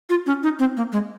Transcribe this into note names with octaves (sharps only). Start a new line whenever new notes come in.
F4
C#4
D#4
C4
A#3
G#3